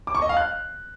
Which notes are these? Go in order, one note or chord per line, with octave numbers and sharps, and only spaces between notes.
D6
C#6
D#5
F5
F#6